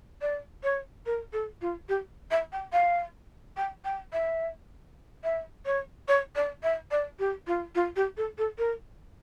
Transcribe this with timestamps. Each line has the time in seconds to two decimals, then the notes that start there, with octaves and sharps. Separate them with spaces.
0.21 D5
0.63 C#5
1.06 A#4
1.33 A4
1.62 F4
1.89 G4
2.31 E5
2.52 G5
2.73 F5
3.57 G5
3.85 G5
4.13 E5
5.24 E5
5.66 C#5
6.08 C#5
6.36 D5
6.63 E5
6.91 D5
7.19 G4
7.47 F4
7.75 F4
7.96 G4
8.17 A4
8.38 A4
8.58 A#4